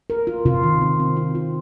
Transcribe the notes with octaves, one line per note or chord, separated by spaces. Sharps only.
A#4
F4
C3 F4
D#3
C4
C4
F4
F4